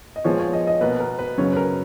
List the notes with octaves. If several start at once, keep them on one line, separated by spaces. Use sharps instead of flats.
D#5
A#2 F3 G#3 B3 C#5
C#5
D#5
D#5
B2 A#3 B4
A#4
B4
F#2 C#3 F#3 C#5
B4
A#4